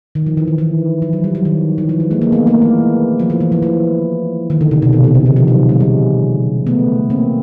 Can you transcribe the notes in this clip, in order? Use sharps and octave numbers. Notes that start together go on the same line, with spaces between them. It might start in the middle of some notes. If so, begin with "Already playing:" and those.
D#3
F3
E3
D#3
E3
F3
F#3
G3
F#3
D#3
E3
F3
F#3
G#3 A#3
G#3 A#3
A3 B3
G#3 A#3
E3
F3
E3
E3
F3
E3
D#3
D3
C3
B2
B2
C3
C#3
D#3
F3
F#3
G#3
G3
A3 B3
A#3 C4